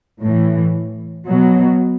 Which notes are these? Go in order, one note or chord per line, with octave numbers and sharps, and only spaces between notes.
A2 E3
B2 F#3